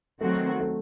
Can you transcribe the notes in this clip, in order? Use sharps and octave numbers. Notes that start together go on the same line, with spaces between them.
D#3 F#3 A3 C4 F#4
A3